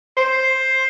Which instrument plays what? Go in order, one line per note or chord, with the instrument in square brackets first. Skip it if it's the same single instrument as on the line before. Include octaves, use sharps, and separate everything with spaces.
[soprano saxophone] C5